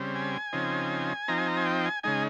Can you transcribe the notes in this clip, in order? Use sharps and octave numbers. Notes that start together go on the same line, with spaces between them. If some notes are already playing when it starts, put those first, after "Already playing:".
Already playing: C#3 G3 C4
G#5
C#3 F3 C4 D#4
F3 C4 D#4 A#5
G#5
A#5
G#5
G5
G#5
C#3 G#3 D#4 G#5